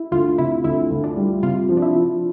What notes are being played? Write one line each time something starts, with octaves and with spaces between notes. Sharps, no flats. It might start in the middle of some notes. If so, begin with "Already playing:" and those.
Already playing: E4
D2 F4
C3 E4
D2 E4
D2
D4
G3
C3 F4
F3
D4
E4
F3